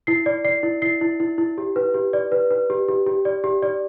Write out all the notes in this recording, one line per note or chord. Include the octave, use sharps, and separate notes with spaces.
E4 C7
D5
D5 C7
E4
E4 C7
E4
E4
E4
G4
B4
G4
D5
B4
B4
G4
G4
G4
D5
G4
D5